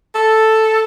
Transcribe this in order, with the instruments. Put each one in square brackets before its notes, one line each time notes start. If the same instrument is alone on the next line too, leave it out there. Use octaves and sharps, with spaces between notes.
[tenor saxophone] A4